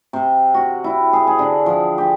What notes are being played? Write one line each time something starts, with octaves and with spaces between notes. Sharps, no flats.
C3
F#4
E4
G#4
G#4
D3
F3
G4